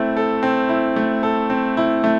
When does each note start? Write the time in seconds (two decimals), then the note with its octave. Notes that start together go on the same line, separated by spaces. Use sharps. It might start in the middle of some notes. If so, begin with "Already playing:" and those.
Already playing: A3 C4 E4
0.17 A4
0.43 C4
0.69 E4
0.96 A3
1.23 A4
1.50 C4
1.77 E4
2.04 A3